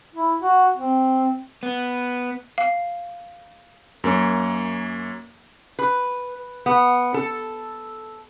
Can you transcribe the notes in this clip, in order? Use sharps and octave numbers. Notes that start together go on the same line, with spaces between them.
E4
F#4
C4
B3
F5
F#2 A#3 C#5
B4
B3
A4